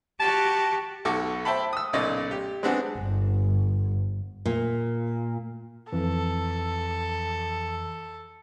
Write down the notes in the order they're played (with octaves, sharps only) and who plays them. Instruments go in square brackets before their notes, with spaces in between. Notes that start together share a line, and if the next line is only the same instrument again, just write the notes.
[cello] F#4 G4 [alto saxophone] A5
[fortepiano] B1 F#4 A4 C#6 D6
C5 E5 G5 A5 B5
D#6 E6
B1 A#2 C#3 D5 D#5 C6
G4
G#3 B3 C4 D4 F#4 G#4
[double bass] G1
[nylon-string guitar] A#2
[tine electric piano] F2 E3 [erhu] A4